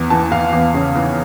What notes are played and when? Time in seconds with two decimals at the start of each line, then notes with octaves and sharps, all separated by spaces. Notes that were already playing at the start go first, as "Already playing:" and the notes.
Already playing: E2
0.10 E3 A5
0.31 E3 F5
0.53 E2
0.74 C#3
0.95 E3